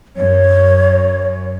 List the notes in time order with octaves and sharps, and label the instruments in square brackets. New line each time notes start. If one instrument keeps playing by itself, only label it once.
[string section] F#2 [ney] C#5